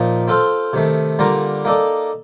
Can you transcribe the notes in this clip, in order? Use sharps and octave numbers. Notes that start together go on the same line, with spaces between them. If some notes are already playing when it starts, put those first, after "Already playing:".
Already playing: A#2 F3 A#3 D#4
C4 F4 A4 C5 F5
C3 D#3 A3
D3 G3 A#3 F4 A#4
A#3 D#4 A4 D5